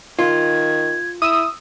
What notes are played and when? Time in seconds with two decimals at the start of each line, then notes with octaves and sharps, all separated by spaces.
0.19 D#3 F4 G#6
1.22 E4 D#6 E6